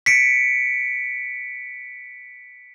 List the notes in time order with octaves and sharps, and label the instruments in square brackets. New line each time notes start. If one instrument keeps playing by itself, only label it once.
[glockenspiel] B6 C#7 D7